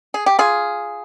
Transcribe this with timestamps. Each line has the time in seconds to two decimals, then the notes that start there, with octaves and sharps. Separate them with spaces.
0.14 G#4
0.26 G4
0.39 F4 G#4